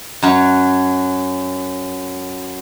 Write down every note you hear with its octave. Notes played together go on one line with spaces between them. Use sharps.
F#2 F#3